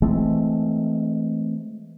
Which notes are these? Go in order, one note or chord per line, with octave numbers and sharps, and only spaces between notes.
E3 G#3 A3 C4